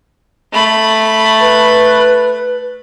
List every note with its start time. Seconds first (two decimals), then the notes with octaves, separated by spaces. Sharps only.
0.52 A3 B5
1.41 B4